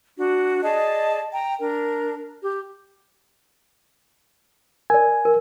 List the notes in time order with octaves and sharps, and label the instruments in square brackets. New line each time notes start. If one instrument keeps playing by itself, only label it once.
[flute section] D4 F#4
G#4 D5 D#5 A5
G5 A#5
D4 A#4
G4
[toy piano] A#4 D5 [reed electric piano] G#5
[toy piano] A#4